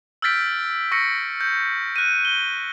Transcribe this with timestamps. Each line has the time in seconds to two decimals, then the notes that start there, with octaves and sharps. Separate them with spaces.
0.22 E6 F6 G6 A6 B6 D7
0.91 C#6 E6 A#6 C#7
1.41 G6
1.96 F#6 D#7
2.25 G7